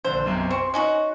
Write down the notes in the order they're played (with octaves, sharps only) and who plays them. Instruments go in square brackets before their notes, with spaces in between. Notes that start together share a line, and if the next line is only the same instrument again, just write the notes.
[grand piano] A#1 D3 [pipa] C5
[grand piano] B1 F#2 C3
[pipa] C4 [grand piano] C6 C#6
[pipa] C#4 D#4 F#4